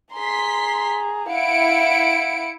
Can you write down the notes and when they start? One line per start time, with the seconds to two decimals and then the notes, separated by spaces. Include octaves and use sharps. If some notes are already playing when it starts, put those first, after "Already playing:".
0.15 G#4 A#5 C6 B6
1.29 E4 F5 F#5 C#7 D7